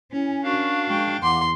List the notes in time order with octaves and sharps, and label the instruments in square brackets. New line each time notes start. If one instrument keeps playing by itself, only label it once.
[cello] C#4 [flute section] E4 G#5
[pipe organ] D4 F5 [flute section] F#4 A#4 C#6
[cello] G#3 G5
[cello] E2 [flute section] F5 F#5 D6 [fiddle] C6